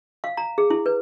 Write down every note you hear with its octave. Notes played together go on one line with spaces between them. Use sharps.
F5
A#5
G#4
E4
B4